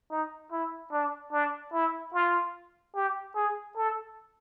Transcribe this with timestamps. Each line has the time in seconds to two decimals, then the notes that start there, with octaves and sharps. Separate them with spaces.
0.11 D#4
0.52 E4
0.92 D4
1.32 D4
1.73 E4
2.13 F4
2.95 G4
3.35 G#4
3.76 A4